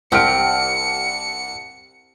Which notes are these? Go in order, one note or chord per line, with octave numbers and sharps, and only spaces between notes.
C2 C4 G4 F6 C#7 D7